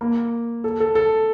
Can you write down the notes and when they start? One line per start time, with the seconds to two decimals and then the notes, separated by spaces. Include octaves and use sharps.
0.01 A#3
0.64 A4
0.80 A4
0.95 A4